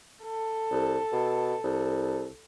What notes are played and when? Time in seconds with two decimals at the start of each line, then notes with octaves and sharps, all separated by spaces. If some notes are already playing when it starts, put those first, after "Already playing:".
0.23 A4
0.71 C2
1.12 B2
1.64 C2